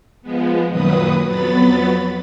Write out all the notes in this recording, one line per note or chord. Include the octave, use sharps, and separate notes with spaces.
F3 G#3 B3
F#2 A#2 D#3 F#3 B4 D#6
F2 F#3 B3 B5 A6